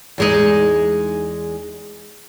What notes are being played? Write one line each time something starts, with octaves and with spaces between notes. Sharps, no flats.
E2 G#3 D#4